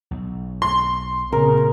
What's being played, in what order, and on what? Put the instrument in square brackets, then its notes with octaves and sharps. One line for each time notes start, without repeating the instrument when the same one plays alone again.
[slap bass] B1
[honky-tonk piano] C6
[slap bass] A#2 C4 [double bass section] C#3 [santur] A#4